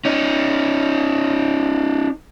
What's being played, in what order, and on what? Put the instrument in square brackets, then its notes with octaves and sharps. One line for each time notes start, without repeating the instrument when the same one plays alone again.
[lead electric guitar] C#4 D#4